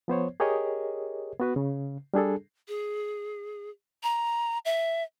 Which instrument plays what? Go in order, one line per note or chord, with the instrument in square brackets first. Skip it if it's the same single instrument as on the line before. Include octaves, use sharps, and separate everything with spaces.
[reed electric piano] F3 B3 C5 C#5
G4 G#4 A#4 C#5 D#5
B3 F#4 B4
C#3
G3 D4 G#4 A4
[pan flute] G#4
A#5
E5